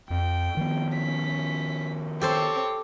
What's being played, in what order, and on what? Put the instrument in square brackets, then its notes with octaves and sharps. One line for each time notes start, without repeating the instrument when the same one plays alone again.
[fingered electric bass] F2 [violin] G5
[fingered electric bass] D#3 F3 B3
[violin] C#4 B6
[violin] C4 C#5 [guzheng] G4 A4 C5